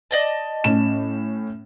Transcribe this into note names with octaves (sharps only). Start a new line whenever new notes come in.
D5 D#5 A5
A2 C#4 E7